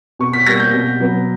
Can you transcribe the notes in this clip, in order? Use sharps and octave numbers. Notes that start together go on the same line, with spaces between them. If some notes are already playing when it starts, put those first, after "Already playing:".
B2 C#6
B6
G3 A#3 A#6
G6
B2
F#3 B3